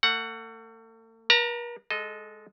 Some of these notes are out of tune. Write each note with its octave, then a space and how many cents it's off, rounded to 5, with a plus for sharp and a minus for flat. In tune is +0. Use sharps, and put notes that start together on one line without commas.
A3 +40 F#5 +0
A#4 +45 A#5 -30
G#3 +0 A4 -25 D#5 +0